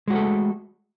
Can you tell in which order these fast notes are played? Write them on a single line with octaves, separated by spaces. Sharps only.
G#3 F#4 A3 A4